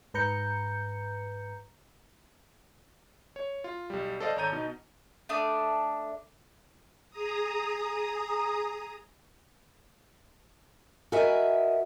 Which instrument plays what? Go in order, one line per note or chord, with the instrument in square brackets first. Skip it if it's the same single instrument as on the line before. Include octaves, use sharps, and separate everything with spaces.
[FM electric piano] G#2 B4 A#5 G6 C#7
[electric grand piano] C#5
F4
B1 G3
A4 C5 D5 D#5 F5
G#1 A4 C#5 A#5 G6 D#7
B2 D#4
[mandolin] A3 D4 D#6
[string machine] G#4 A#5 D#6
[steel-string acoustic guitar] F#4 A#4 B4 D#5 E5 G#5